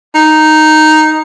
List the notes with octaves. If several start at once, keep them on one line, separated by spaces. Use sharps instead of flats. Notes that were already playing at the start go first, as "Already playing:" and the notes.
D#4